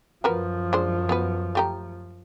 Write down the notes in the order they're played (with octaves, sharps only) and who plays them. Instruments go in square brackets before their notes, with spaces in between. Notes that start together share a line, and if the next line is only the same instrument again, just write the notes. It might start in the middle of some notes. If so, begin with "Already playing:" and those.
[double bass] F#2 F3 [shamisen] F#4 A#4 B4
[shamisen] G#3 D4 C5
B3 F#4 B4
A3 G4 A#5